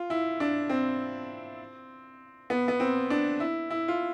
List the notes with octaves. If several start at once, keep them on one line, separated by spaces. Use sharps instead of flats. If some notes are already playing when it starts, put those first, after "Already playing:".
Already playing: F4
E4
D4
C4
B3
B3
C4
D4
E4
E4
F4